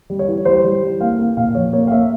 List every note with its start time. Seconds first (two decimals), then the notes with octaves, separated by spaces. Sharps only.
0.10 G3
0.19 C#5
0.28 E3
0.45 G3 C5
0.64 G3
0.82 E3
1.01 A#3 F5
1.19 A#3
1.37 A#2 F5
1.55 F3 C#5
1.73 A#3 C#5
1.87 F5
1.91 A#3 E5